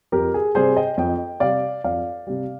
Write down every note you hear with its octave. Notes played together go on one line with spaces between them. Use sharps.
F2 G4 A#4
G#4
C3 G3 G#4 C5
D#5 G5
F2 D#5 G5
C3 G3 D5 F5
F2 D5 F5
C3 G3